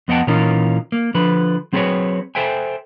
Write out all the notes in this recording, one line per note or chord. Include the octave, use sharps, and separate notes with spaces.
F2 B3 D#5 F#5 G5 A5
A#2 E3 C#4 D#4 F4 A#4
A#3
D3 F3 B4
F#3 C4 G#4 A4 B4 C#5
A4 C5 E5 G5 G#5